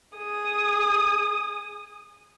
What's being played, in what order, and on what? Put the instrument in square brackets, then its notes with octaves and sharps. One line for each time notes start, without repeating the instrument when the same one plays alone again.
[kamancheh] G#4 D#6